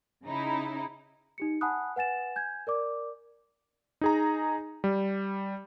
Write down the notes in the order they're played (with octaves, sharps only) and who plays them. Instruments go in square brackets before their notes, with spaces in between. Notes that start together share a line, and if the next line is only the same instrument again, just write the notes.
[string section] C#3 D#4 E4
[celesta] D#4 G4 C#7
F#5 G#5 A5 B5 D#6 F#6
B4 F#5 G#5 A6 E7
G#5 G6 G#6
A#4 D5 D6
[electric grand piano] D#4 G#4 A#5
G3